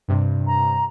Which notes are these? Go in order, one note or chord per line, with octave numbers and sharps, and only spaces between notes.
G2 C3
A#5